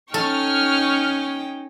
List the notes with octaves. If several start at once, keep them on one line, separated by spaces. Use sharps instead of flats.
C#4 D#4 A4 G5 C#6 F6